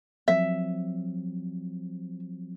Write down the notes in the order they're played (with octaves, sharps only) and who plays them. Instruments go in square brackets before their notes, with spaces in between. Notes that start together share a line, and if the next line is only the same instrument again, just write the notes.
[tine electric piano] F3 F#3 C4 [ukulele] E5